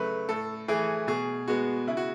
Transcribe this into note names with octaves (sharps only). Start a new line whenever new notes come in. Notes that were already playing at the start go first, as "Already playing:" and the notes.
Already playing: C#3 F#3 A3 B4
A2 A4
E3 A3 G#4
B2 G#4
G#3 B3 F#4
C#3 E4
F#4